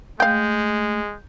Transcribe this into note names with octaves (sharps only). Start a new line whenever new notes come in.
G#3 A3 F5 G5 G6